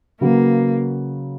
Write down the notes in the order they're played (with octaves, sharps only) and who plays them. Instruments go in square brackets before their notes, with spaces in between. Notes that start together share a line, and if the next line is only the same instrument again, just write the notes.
[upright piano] C#3 F#3 C#4 F#4 B4 [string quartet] A#3